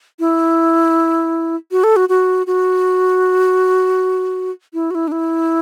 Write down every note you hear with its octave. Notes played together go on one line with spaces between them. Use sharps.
E4
F#4
A4
F#4
F#4
F#4
E4
F#4
E4
D4
E4